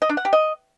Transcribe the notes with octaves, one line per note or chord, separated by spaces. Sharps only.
D#5
D4
F#5
G4
D#5